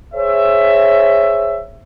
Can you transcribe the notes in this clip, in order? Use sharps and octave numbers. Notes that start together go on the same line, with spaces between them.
G#4 C5 C#5 E5